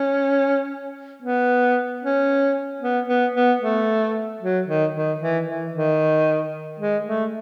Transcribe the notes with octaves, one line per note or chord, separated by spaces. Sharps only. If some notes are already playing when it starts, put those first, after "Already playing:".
Already playing: C#4
B3
C#4
B3
B3
B3
A3
F#3
D#3
D#3
E3
E3
D#3
G#3
A3